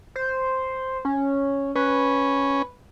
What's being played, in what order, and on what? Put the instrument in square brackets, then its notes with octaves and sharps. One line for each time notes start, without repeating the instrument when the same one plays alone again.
[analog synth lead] C5
C#4
[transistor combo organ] C#4 [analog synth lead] B4